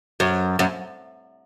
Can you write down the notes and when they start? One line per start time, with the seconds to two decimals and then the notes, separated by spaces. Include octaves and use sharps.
0.20 F#2
0.59 F#2